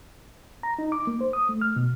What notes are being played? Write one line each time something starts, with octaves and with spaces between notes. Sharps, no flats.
A#5
D#4
D6
A#3
C5
D#6
A3
F6
B2